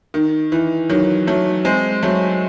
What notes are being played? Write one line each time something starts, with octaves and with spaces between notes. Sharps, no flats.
D#3
E3
D#3 F#3
F#3 A3
G#3 C4
F#3 A3